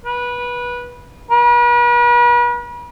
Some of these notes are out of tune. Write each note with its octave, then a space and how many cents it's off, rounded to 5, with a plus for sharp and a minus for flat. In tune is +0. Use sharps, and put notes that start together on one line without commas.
B4 -20
B4 -45